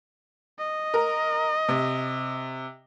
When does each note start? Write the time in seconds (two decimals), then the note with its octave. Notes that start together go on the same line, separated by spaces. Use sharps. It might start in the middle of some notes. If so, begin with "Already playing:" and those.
0.59 D#5
0.94 A#4
1.68 C3